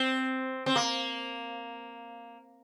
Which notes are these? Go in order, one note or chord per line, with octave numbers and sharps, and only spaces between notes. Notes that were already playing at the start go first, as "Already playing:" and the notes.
Already playing: C4
C4
A#3